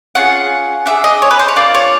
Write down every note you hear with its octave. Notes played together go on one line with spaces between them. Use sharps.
C#4 F4 G#4 F#5
D4 F4 G#4 E5
D#5
C#5
B4
C5
C#5
A#3 D4 F4 D5
C#5